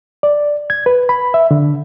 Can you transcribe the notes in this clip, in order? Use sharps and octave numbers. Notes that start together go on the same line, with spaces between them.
D5
G#6
B4
B5
E5
D3